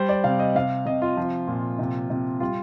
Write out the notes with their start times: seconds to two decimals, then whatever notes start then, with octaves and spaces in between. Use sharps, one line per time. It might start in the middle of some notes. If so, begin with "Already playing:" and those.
Already playing: G3 C5
0.09 D5
0.24 C3 F5
0.39 D#5
0.55 C3 F5
0.86 C3 D#5
1.02 F4
1.17 F3
1.48 A#2
1.79 C3
2.10 C3
2.40 G3 F4